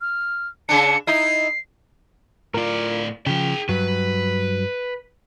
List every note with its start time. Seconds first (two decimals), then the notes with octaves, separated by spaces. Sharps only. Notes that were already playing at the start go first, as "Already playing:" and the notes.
0.01 F6
0.69 C#3 D4 C#7
1.07 D#4 E4 C7
2.54 A2 F4 A#4 D5
3.26 C#3 F3 G#4 G5
3.69 G2 F#3 B4